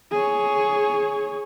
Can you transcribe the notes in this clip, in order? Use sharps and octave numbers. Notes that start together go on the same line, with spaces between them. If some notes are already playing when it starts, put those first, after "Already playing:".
G#4 C#5